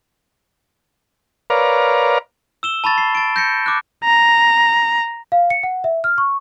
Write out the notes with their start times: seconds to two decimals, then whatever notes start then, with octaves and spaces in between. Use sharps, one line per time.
1.50 A#4 B4 C#5 D5 F5 A#5
2.63 E6 E7 G7
2.84 A5 B5 C#6 A6
2.98 C7
3.15 A6 D7
3.36 G6 A#6 C#7
3.66 D6 F#6
4.04 A#5
5.32 F5
5.50 C#7
5.63 F#5
5.84 E5
6.04 F6
6.18 C#6